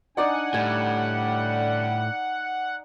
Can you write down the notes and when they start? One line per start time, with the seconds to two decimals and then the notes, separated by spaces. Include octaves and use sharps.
0.17 D4 D#4 D5 D#5 F#5 G#5
0.54 A2 D3 G3 G#5